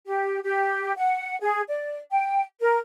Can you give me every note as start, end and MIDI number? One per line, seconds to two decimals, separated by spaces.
0.06 0.39 67
0.44 0.92 67
0.96 1.37 78
1.41 1.62 68
1.70 1.98 74
2.11 2.43 79
2.60 2.77 70